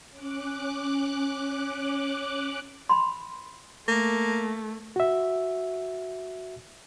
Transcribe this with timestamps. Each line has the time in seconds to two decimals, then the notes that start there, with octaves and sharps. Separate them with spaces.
0.10 C#4 D6 F#6
2.89 B5 C6
3.88 A3 A#3
4.96 F#4 E5